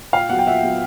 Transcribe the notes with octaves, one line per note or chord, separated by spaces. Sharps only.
A#2 F5 G5
F#3 B3 F#5
G5
A#2 E5 F#5
F#3 B3